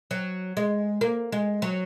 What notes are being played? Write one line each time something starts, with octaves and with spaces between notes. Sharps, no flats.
F#3
G#3
A#3
G#3
F#3